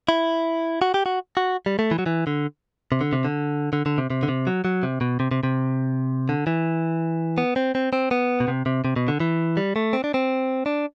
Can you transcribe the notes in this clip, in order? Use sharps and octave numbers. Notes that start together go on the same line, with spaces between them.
E4
F#4
G4
F#4
F#4
G3
A3
E3
F#3
E3
D3
C3
D3
C3
D3
D3
D3
C3
C3
D3
C3
F#3
F#3
C3
B2
C3
C3
C3
D3
E3
B3
C4
C4
C4
B3
B2
C3
C3
C3
B2
D3
E3
G3
A3
C4
D4
C4
D4